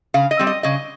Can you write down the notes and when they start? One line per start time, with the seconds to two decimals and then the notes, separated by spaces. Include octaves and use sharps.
0.14 C#3 F5
0.31 D#5
0.39 G3 C4
0.47 D#5
0.63 C#3 D#5